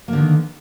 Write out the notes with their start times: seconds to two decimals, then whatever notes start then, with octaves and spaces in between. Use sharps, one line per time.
0.08 A#3
0.13 D3
0.18 D#3